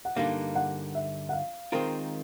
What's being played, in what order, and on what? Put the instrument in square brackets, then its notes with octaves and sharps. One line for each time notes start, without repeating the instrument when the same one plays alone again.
[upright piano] F#5
[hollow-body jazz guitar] G2 D3 G3 A#3 D#4 [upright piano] F5
[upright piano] F#5
E5
F#5
F5
[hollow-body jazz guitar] D#3 G#3 C4 F4 A#4